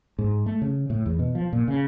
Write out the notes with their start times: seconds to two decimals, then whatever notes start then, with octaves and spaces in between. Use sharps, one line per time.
0.19 G#2
0.46 A3
0.62 C#3
0.90 A2
1.06 E2
1.19 B2
1.35 F3
1.53 A#2
1.68 C#3